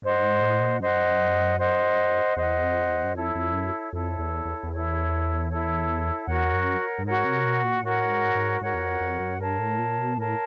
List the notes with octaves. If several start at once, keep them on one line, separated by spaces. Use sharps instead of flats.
G2 C5 D#5 F#5
G#2
A2
A#2
F#2 C5 D#5 F#5
C5 D#5 F#5
E2 C5 D#5 F#5
F2
E2
F#2
F2 E4 A4 C#5
F2
F#2
F2 E4 A4 C#5
E2
E2
E2
E4 A4 C#5
E4 A4 C#5
E2 F#4 A#4 C#5 F#5
F#2
G2
G#2 F#4 A#4 C#5 F#5
C3
B2
A#2
A2 F#4 A#4 C#5 F#5
G#2
G#2
G#2 F#4 A#4 C#5 F#5
E2
F2
F2
F#2
G2 A#4 C#5 F5 A5
A2
A#2
B2
A2 A#4 C#5 F5 A5